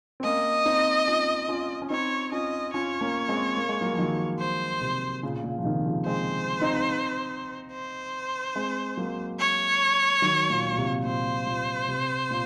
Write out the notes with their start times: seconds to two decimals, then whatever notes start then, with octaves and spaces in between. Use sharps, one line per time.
0.20 C4
0.24 A#3 C#4 D#5
0.65 C4 D#4
1.08 C#4 F4
1.48 C#4 F4
1.82 C#4
1.90 C4 D#4 C#5
2.32 C#4 F4 D#5
2.74 C#4 F4 C#5
3.01 A#3 C#4
3.29 G#3 C4
3.57 A#3
3.69 G#3
3.81 F#3 A#3
3.93 F3
3.99 D#3 F#3
4.39 C5
4.82 C3
5.23 A#2 C#3
5.44 A#2 C#3
5.58 F3
5.64 C3 D#3
5.85 C#3 F3
6.06 G#3 C4 C5
6.61 C4 D#4
7.72 C5
8.56 G#3 C4
8.97 F#3 A#3
9.39 C#5
10.22 D#3 F#3
10.50 A#2
10.72 A#2
10.78 C3
11.05 A#2 C5
11.47 A#2
11.88 C3
12.31 A#2